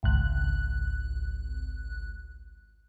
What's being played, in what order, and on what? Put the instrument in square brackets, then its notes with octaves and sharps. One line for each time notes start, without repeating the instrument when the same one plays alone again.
[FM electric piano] G#1 C#2 F#6